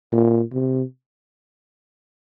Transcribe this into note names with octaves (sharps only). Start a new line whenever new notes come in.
A#2
C3